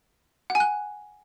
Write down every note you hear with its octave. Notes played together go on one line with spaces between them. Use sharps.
F#5
G#5
F#6